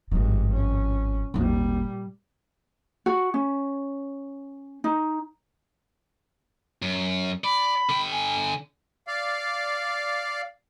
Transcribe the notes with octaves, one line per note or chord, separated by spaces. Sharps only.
G#1 G2 F3 G#3
C#4
G#1 D#2 A#2 G3
F#4
C#4
D#4
F#2
D5 B5
D3 G5
G#5
D5 F5